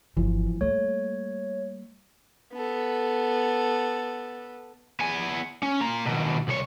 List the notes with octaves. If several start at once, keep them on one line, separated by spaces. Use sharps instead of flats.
G1 E3 F3
G3 A3 A#3 C#5
B3 A4
B3 G#5
C#4
F4 A#5
D#2 B2
C2 C#5